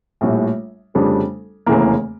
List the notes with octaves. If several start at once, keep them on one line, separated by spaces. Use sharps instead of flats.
A#1 A2 G3
F1 F2 C#3 G3 D4
F1 E2 C#3 E3 A#3